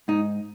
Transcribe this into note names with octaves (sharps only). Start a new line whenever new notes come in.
G#2 D#4